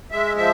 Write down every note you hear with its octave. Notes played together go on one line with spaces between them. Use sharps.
G#3 E5
F3 E5